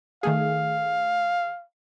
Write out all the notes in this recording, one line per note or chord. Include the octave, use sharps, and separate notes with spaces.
D#3 A3 G#4 F5